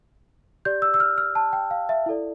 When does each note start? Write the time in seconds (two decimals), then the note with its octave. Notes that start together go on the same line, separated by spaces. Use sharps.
0.65 G4 D5 G6
0.82 E6
0.94 E6
1.00 F6
1.18 F6
1.35 A5
1.53 G5
1.71 F5
1.89 E5
2.06 E4 A4 D5